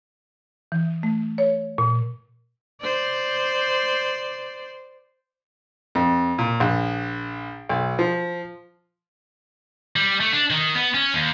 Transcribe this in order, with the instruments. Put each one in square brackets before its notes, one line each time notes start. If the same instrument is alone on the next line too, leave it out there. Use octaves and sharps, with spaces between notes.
[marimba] E3
A3
C#5
A#2
[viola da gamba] C5 D5
[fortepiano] F2
A#2
A#1
B1
F3
[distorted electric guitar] G3
A3
D4
D#3
B3
C#4
D#2